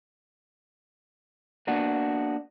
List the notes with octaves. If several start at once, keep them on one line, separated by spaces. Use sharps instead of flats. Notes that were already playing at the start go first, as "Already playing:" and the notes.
A#3 B3 D4 F#4